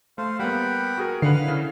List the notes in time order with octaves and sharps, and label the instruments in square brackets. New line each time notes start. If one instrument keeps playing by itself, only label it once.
[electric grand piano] A3 [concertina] C5 F5
[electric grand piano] G3 A#3 B3 [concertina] F#5 G5 B5
[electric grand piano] F#4 G#4 A#4
[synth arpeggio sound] D3 [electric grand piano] B4 F#5 C7 [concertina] F5 F6
[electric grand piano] C#3 E4